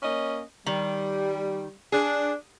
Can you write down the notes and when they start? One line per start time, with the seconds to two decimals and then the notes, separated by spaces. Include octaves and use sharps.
0.03 A#3 C#4 D#5
0.66 D#3 G3
1.92 D4 G#4